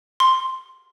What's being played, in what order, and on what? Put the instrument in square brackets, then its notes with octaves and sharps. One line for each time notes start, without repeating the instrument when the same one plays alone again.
[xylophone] C6